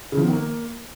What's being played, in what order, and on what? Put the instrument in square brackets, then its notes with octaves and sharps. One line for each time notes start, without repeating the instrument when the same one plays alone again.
[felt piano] C#3
F3
B3
D#3
A#3